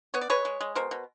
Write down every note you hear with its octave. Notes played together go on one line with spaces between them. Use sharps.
B3 C#5
D5
G#3 B4 C#5
G#3
G#3
B2 A#4 C5
B2